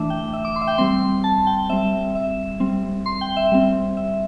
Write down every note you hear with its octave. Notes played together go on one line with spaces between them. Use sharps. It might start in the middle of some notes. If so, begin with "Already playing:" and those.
Already playing: E3 A3 D4 E5
G5
E5
D6
C6
E5
G5
G3 C4 C6
A5
G5
G3 C4 E5
E5
G3 C4
C6
G5
E5
G3 C4
E5